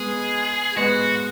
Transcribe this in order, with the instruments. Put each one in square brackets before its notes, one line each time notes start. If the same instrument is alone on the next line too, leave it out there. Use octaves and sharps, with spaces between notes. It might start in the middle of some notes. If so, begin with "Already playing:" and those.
Already playing: [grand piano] G#3 B3 [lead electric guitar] G#4
[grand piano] G#3 B3 [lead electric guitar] F#4